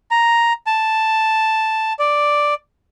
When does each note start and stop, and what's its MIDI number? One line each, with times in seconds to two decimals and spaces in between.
0.11 0.53 82
0.67 1.93 81
1.99 2.54 74